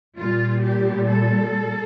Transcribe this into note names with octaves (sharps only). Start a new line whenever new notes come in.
A#2 G3 F4
G4
A4